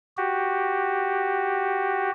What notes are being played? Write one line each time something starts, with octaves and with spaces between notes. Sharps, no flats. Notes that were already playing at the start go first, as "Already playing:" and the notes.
F#4 G4